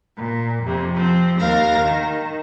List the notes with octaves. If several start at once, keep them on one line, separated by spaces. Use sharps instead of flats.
A#2
F2 C3
F3 C4
D#2 A#4 F5 A#6
D#3